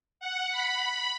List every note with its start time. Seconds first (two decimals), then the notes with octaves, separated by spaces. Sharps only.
0.20 F#5
0.51 B5